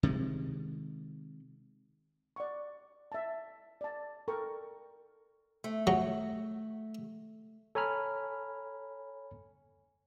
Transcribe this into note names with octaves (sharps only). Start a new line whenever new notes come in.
C3 D#3 G#3
D5 F#5 C#6
E5 A5
D5 A5
A4 A#4 G5 C#6
A3
F#3
A4 C#5 G#5 A#5 B5 F6